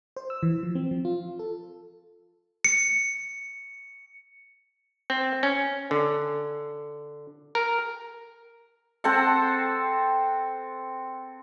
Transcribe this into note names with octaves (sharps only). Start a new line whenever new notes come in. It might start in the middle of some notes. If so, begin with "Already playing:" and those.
C5
E6
E3
F3
C4
F3
F4
A4
C#7
C4
C#4
D3
A#4
C4 A4 F#5